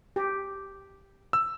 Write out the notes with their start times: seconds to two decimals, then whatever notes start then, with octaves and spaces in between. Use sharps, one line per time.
0.16 G4
1.33 E6